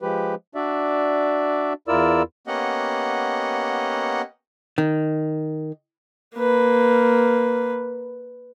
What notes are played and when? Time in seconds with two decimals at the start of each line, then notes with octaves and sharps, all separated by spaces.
0.02 F3 G#3 G4 B4
0.55 D4 F#4 D5 E5
1.88 E2 E4 F4 A#4 D5 E6
2.47 A#3 B3 C#4 G4 D#5 F#5
4.78 D#3
6.37 A#3 B4